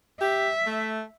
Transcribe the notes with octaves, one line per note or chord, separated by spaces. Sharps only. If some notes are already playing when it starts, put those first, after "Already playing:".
G4 E5
A3